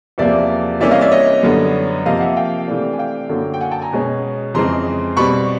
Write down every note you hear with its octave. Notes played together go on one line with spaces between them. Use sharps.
E2 C3 F3 A#3 D5 E5
C3 E3 G3 A#3 C#4 D5 E5
D#5 F5
D5 E5
C#5 D#5
F#2 D3 G3 B3
C3 F3 A#3 D#5 F5
E5 F#5
F5 G5
C3 E3 A3 D4
G#5
F5 G5
F#2 D3 F#3 A#3
G5
F#5 G#5
G5 A5
G#5 A#5
B2 G#3 C#4
F2 C#3 E3 G#3 C4 A#5 C6
B2 G3 C4 B5 C#6